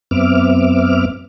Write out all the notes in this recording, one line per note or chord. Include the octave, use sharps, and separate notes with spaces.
F#2 B3 C4 E5 D6 F6